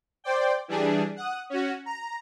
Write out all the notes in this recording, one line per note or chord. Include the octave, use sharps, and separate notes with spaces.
C5 D5 G5
E3 G3 D4 G#4
F#5 D#6
C#4 F#4
A#5